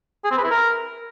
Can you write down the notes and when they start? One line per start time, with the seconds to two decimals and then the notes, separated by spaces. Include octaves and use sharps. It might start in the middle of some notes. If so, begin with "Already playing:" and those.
0.24 G#4
0.31 C4
0.37 B4
0.44 E4
0.51 A#4